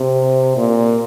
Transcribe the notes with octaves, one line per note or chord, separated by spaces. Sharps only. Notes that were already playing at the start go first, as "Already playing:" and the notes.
Already playing: C3
A#2